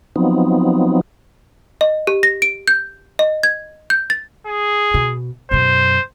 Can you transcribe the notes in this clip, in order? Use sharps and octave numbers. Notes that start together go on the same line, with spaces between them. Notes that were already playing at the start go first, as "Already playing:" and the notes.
F3 F#3 B3 C4 D#4
D#5
G4
A#6
D7
G6
D#5
G#6
G6
A6
G#4
B2
F#2 B2 C5